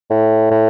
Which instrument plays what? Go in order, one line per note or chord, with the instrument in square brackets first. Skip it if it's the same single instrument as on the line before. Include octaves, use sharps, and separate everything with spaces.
[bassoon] A2
A2